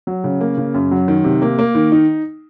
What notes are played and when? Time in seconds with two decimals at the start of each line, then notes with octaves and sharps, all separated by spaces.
0.07 F#3
0.24 C#3
0.40 A#3
0.57 C#3
0.74 F#2
0.91 F#3
1.08 D#3
1.24 C3
1.42 A#3
1.59 A#3
1.75 D#3
1.92 D#4